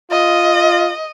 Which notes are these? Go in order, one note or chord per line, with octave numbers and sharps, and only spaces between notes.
F4 D#5